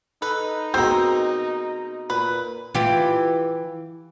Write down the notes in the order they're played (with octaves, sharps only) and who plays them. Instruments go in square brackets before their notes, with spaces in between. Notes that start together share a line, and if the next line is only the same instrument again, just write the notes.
[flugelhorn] D#4 [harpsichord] A4 [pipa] B4
[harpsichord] B2 G#3 A#3 [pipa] C4 [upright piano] A#5 G6
[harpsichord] A#2 [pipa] B4
[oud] E3 F4 G4